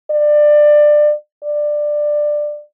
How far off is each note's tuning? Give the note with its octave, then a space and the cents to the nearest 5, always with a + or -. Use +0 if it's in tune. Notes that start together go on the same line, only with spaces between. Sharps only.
D5 +20
D5 +15